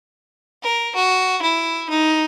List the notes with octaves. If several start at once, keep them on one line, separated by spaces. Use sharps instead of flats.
A#4
F#4
E4
D#4